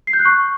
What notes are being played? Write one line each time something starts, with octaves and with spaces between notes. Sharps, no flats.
C7
G6
F#6
C#6